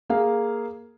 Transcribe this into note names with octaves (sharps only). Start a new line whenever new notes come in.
A#3 G#4 F5